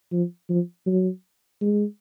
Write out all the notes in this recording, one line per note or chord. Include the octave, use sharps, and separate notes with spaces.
F3
F3
F#3
G#3